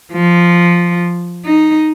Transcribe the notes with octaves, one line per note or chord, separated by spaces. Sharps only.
F3
D#4